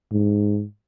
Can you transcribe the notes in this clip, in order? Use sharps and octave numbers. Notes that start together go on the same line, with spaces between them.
G#2